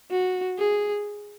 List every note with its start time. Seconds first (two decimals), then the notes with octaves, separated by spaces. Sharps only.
0.11 F#4
0.58 G#4